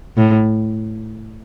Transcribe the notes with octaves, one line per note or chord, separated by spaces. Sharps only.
A2